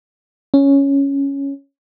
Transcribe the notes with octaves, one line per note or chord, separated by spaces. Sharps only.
C#4